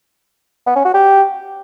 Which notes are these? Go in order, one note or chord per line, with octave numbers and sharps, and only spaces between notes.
B3
C#4
F#4
G4